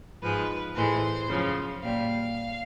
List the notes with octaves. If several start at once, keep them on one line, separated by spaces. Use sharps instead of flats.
G#2 F3 G#3 B4
A2 E3 G#3 C5
F#2 C#3 F3
A#2 G3 F5